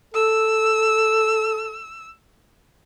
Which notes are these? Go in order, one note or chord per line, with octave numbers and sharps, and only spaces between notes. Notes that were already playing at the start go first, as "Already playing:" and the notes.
A4 E6